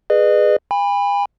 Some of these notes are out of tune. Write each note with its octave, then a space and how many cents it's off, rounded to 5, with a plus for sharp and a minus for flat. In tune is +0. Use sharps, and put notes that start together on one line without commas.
G#4 +0 B4 +0 D#5 -40
G#5 -45 B5 +0